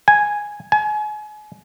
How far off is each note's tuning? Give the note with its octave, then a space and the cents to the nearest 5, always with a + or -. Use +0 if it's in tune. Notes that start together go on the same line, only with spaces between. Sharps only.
G#5 +0
G#5 +35